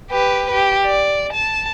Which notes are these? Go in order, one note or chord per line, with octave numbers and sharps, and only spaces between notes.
G4 B4
G4
D5
A5